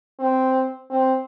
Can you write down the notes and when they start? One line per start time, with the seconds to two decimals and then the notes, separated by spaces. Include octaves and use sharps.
0.20 C4
0.91 C4